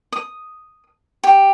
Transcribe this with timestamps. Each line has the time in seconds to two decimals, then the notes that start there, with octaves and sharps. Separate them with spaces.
0.12 D#6
1.24 G4